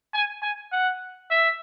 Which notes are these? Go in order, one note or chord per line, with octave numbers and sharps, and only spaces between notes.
G#5
G#5
F#5
E5